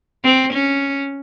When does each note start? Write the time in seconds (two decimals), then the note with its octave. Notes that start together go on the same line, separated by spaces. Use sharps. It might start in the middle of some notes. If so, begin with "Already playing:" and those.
0.24 C4
0.53 C#4